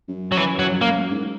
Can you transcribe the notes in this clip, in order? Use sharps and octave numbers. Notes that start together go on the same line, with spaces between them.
F#2
F#3
E3
F#3
A#3
G#2